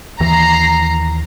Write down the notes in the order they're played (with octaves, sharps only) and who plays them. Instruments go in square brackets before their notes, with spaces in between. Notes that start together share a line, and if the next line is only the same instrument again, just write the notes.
[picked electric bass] D#2 E3 [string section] A#5 C7